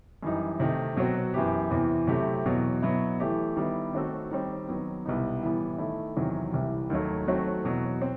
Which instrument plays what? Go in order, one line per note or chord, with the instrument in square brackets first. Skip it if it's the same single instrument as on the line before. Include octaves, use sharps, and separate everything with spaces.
[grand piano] F#2 E3 G3 D#4
C3 D#3 A3 D#4
B2 F#3 C4 F#4
F#2 E3 B3 E4 G4
E2 C3 E3 B3
C3 F#3 A3 E4 G4
E2 B2 F#3
B2 F#3 B3 E4
E3 A3 E4 G4
D#3 G3 B3 E4
D#3 A3 C4 F#4 A4
D#3 G3 C4
D#3 F#3 B3
C2 B2 G3 B3 D#4
A2 E3 G3 B3
D#3 A3 E4
E2 C3 D#3 F#3
C2 C3 E3 G3
D#2 D#3 F#3 A3
D#3 F#3 A3 C4 F#4
E2 B2 F#3
C4